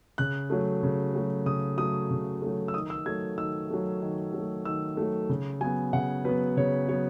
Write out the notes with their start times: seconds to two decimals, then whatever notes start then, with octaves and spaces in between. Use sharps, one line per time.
0.18 C#3 F#6
0.50 F#3 A3
0.83 C#3
1.14 F#3 A3
1.46 C#3 D#6
1.78 F#3 A3 D#6
2.11 C#3
2.42 F#3 A3
2.68 E6
2.74 D#3 D#6
2.90 E6
3.06 F#3 A3 G#6
3.38 D#3 E6
3.70 F#3 A3
4.01 D#3
4.33 F#3 A3
4.65 D#3 E6
4.97 F#3 A3
5.29 C#3
5.61 F#3 B3 G#5
5.93 C#3 F#5
6.25 F#3 B3 B4
6.57 C#3 C#5
6.88 F#3 B3 C#5